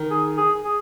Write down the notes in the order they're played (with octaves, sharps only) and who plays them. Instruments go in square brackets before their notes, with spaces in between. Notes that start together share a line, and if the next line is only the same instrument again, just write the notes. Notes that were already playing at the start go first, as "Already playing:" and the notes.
Already playing: [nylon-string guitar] D#3
[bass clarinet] G#4
G#4
G#4